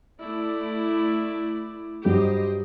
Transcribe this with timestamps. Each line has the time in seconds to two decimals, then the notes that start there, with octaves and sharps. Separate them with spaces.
0.22 A3 E4 D5
2.05 G2 F#3 G3 G4 C5 D#5